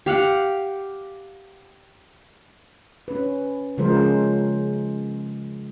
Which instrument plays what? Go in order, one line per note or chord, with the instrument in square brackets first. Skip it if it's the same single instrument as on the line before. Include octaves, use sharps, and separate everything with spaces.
[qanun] G4 F5 F#5
[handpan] C#4 B4
C#3 F3 G#3 A#4 C5